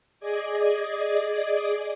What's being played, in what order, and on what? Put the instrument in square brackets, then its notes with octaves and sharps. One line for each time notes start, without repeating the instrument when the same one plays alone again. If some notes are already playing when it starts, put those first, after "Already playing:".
[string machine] G#4 D5 D#5 D6 G#6